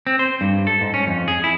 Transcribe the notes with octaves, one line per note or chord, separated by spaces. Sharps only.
C4
C5
G2
A4
G#2
C#4
F2
G#4
E4